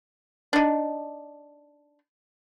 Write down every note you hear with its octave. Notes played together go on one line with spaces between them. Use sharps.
D4 D#4